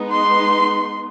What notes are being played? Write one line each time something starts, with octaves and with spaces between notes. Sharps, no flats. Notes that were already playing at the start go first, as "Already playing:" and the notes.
Already playing: G#3 B3 D#4
C6